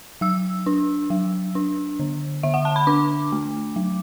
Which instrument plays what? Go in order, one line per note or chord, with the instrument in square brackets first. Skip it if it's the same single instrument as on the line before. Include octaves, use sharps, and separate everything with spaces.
[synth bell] F#3 E6
D4
F#3
D4
D3
D3 E5
F#5
A5
B5
D4 D6
A3
F#3